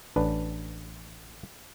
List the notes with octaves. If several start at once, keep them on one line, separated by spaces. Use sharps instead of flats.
A1 D4 B4